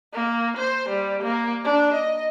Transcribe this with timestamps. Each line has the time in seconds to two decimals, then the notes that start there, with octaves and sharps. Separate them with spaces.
0.13 A#3
0.57 C5
0.89 G3
1.23 A#3
1.64 D4
1.94 D#5